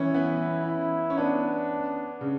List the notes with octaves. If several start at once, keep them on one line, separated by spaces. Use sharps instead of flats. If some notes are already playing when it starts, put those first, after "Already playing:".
Already playing: E3 C#4 E4
B3
E4
C#4
B3 D4
C#3